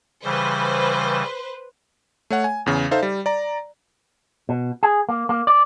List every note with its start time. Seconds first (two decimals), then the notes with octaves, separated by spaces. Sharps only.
0.24 C#3 E3 G3 B4 C5
2.30 A3 C#5 F#5
2.44 G#5
2.66 E2 C#3
2.91 D#4 A4 C5 E5 F5
3.03 G3
3.26 D5 A#5
4.49 B2
4.83 G#4
5.09 A#3
5.29 A#3
5.47 D5